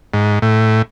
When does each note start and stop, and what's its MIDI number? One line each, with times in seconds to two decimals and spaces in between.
0.14 0.39 44
0.42 0.82 45